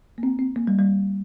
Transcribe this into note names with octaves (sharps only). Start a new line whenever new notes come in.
A#3
C4
C4
A#3
G3
G3